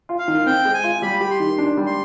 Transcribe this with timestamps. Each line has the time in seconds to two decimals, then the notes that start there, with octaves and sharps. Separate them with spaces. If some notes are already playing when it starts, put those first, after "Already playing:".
0.09 F4
0.18 F5
0.28 D#3
0.46 C4 G5
0.65 G#3
0.74 G#5
0.83 F4
1.02 G3 B5
1.21 G4
1.30 C6
1.40 D#3
1.58 D4
1.77 G3
1.86 C6